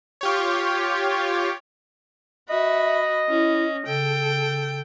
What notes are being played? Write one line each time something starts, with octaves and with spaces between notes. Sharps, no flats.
F4 G4 C#5
F#4 D#5 E5 B5
C#4 E4
C#3 A4 G5